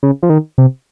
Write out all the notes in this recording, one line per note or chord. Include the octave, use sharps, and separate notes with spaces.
C#3
F3
D#3
C3